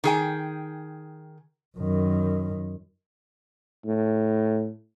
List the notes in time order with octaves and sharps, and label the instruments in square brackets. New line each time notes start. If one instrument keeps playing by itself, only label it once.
[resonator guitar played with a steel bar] D#3 G#4 G5
[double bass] F#2 D#3
[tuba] A2